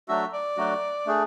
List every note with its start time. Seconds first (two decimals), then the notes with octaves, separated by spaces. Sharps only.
0.08 F#3 A3 D4 F#4 E5
0.33 D5
0.57 F#3 A3 D4 F#4
1.06 A3 D4 G#4